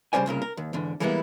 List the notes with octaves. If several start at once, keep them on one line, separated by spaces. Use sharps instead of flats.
C#3 G3 D4 C5 D5 G#5
C2 A#2 C#3 A#4
A#4
D#2
E2 G#2 D3
E3 G3 G#3 A#3 B3 E4